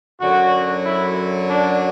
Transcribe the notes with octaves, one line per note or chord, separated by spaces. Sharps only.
F#2 D3 F#3 F#4
E4
D4